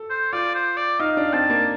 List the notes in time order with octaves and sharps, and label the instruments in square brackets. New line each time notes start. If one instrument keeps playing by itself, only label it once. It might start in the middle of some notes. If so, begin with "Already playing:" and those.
Already playing: [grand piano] A4
[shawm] C5
[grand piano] F4 [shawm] D5
[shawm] C5
D5
[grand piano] D#4 [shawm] F5
[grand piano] D4
[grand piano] C4 [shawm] A5
[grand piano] A#3